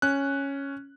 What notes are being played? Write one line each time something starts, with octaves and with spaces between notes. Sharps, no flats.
C#4 F#6